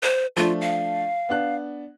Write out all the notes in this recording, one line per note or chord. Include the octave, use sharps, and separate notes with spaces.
C5
F3 A3 D4 F4
F5
B3 D4 F#6